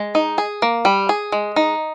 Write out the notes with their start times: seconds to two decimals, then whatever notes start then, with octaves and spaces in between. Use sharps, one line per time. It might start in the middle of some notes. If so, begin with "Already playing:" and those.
Already playing: G#3
0.15 D#4
0.38 G#4
0.62 A#3
0.85 G3
1.09 G#4
1.32 G#3
1.56 D#4